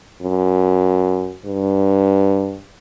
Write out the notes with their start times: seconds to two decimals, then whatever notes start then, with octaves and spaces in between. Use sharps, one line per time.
0.21 F#2
1.46 G2